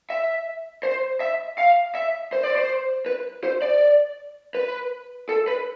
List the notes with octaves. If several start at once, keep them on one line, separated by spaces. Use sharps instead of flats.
E5
C5
E5
F5
E5
C5
D5
C5
B4
C5
D5
B4
A4
B4